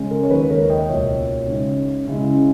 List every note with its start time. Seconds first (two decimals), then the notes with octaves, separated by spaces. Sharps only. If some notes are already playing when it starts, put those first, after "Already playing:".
Already playing: C#3 G#3 C#4
0.11 A#4
0.23 C#5
0.30 D#2 D#3 A#3 D#4 B4
0.50 A#4 C#5
0.70 D#5 G5
0.89 C#2 B2 A#3 C#5 E5
1.48 C#3 G#3 D#4
2.07 C#3 G#3 C#4 E4